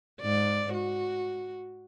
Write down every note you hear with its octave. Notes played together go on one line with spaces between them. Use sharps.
G#2 D5
F#4